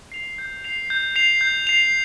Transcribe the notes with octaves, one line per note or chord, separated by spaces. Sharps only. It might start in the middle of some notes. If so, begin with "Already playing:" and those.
C7 F7
G6
C7 F7
G6
C7 F7
G6
C7 F7